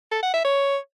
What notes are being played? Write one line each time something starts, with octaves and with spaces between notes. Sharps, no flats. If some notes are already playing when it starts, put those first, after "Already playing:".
A4
F#5
E5
C#5